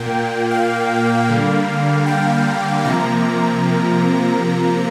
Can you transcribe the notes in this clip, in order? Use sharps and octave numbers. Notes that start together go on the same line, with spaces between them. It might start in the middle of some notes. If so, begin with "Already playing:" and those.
Already playing: A#2 A#3 G5
F5
D3 G3 A#3
G5
C3 F3 A#3 A#5